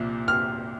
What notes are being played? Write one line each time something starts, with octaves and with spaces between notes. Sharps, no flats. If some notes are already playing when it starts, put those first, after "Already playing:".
Already playing: C2 A#2 F3
F6